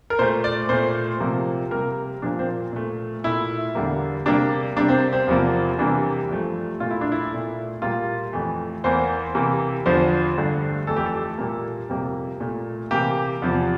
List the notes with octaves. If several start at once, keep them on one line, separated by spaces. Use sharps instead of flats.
A#4
A#2 A3 C5
D5
A#2 A3 C5
C3 F3 A#3
C3 G3 A#3 A#4
A#2 F3 A#3 D4
C4
A#2 A3
A#2 A3 E4
E2 D3 G3 A#3
C3 G3 A#3 D4
C3 G3 A#3 D4
C4
C4
E2 C3 F3 A#3
C3 E3 G3 A#3 D4
G2 F3 A3
A#2 A3 F4
E4
D4
E4
A#2 A3
A#2 G3 A#3 F4
F2 E3 A3
E2 E3 A#3 C5
C3 E3 A#3
E2 D3 F3 C5
G2 D3 A3
F2 E3 A3 A4
G4
A4
A#2 G3 A#3
F2 C3 G3 A#3
A#2 A3
C3 E3 A#3 G4
E2 C3 F3